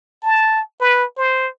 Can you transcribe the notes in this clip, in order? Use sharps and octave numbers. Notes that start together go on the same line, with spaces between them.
A5
B4
C5